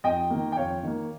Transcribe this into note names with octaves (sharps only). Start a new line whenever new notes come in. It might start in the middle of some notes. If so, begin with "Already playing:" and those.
F2 D#5 G5
D#3 A#3
G5
F2 C#5 F5
D#3 A#3